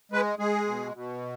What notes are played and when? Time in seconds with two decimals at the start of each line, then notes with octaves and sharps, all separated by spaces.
0.12 G#3 B4
0.39 G#3 G#4
0.67 B2
0.94 B2